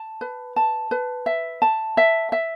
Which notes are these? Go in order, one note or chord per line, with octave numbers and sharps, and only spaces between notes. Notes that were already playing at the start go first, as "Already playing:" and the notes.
Already playing: A5
B4
A5
B4
E5
A5
E5
E5